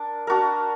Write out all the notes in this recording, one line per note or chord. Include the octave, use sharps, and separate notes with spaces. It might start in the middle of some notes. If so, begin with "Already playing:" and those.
Already playing: D4 A#4
D4 F#4 A#4